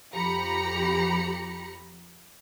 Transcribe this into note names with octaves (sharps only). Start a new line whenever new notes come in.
F2 F3 G4 A#5 B5 C#7